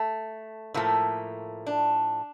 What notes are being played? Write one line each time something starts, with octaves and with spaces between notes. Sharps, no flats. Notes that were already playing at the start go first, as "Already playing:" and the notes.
Already playing: A3
A2 F3 A3 A#3
D4